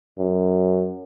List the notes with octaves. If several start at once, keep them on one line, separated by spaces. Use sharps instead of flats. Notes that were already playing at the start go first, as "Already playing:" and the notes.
F#2